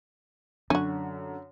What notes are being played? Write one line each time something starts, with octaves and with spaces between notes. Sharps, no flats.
F#2 D3 C#4 D4 F#4